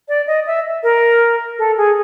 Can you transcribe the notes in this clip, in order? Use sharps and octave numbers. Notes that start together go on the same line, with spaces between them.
D5
D#5
E5
A#4
A4
G#4